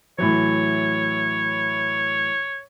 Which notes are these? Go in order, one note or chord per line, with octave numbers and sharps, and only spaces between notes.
A2 E3 F#3 C#5